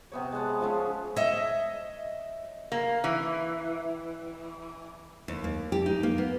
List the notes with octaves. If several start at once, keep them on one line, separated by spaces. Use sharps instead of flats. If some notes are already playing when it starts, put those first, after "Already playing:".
C3 B3 C#5
G#3 C#5 F#5 A5
F3 G#3 C#4 E5
C#5 D#5 E5
A#3
E3
D#2
A#3
G4
D#4
A#3
B3